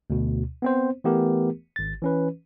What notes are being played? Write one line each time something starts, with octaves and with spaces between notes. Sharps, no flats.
D2 B2
B3 C4 C5
E3 A3 B3 G4 A#4
G#1 A6
E3 C#4 B4